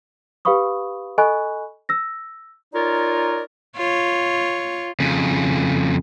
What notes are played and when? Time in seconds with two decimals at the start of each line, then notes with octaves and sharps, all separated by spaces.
0.45 G4 B4 F5 B5 C#6 D#6
1.18 A4 D#5 G#5 B5 C#6 F#6
1.89 E6 A#6
2.73 D#4 F4 A#4 C#5 D5
3.77 F4 C#5
5.00 F2 C#3